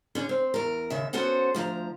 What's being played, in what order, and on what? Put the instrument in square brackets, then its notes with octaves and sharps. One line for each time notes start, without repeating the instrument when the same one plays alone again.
[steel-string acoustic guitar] D3 C#4
C4
E2 A#4
D#2 C#3 E5
B3 C#4 F#4 A4 C5 F#5
D2 F3 C#5 A#5